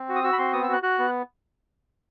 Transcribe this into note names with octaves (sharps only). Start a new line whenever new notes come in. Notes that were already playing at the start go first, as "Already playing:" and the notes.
Already playing: C4
F#4
D#6
F#4 E6
B5
C4 C6
B3 D#6
E6
F#4 F#6
F#4 F#6
B3